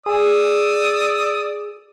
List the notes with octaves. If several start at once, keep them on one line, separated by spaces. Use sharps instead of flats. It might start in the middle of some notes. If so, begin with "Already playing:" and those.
G#4 D5 D#6 E6